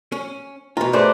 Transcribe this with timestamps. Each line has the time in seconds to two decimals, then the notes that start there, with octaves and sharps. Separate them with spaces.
0.12 C#4
0.77 B2 F4 A#5
0.93 A3 G#4 B4 C5 D5